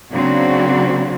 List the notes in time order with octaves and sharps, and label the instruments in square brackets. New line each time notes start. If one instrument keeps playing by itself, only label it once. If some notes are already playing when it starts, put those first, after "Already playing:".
[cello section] C#3 F#3 A#3 C4 D4 F#4